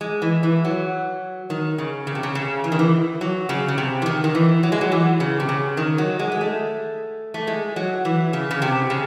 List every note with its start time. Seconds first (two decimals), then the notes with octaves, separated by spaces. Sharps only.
0.01 G#3
0.22 E3
0.43 E3
0.65 F#3
1.50 D#3
1.78 C#3
2.07 C#3
2.15 C3
2.23 C#3
2.35 C#3
2.64 E3
2.72 D#3
2.79 E3
3.21 F#3
3.49 C#3
3.68 C#3
3.78 C3
4.02 E3
4.06 D#3
4.24 D#3
4.35 E3
4.63 F#3
4.72 G#3
4.81 F#3
4.92 E3
5.20 C#3
5.40 C3
5.49 C#3
5.77 D#3
5.98 F#3
6.19 G#3
6.32 G#3
6.41 A3
7.34 A3
7.47 G#3
7.76 F#3
8.05 E3
8.33 C#3
8.51 C#3
8.62 C3
8.90 C#3